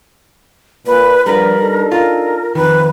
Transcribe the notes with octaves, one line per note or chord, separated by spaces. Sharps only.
A#2 B4
D3 F3 G3 A#4 B4
D4 D#4 A4
F4 A#4
F2 D#3 B4